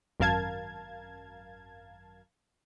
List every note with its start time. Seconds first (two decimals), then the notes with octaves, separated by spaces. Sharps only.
0.20 G#1 F#2 A#4 F5 A5 G#6